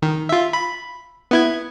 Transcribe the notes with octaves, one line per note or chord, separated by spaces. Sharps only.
D#3
F4 E5
B5
B3 E4 G#6